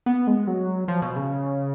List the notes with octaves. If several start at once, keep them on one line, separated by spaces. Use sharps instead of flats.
B3
G#3
F#3
F3
B2
C#3